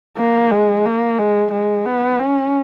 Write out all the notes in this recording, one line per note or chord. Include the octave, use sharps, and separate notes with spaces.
A#3
G#3
A#3
G#3
G#3
B3
C#4